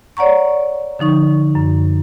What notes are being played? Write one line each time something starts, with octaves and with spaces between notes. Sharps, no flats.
C#5 D5 F#5 A#5 C#6
D3 F3 D#4 C#6
F#2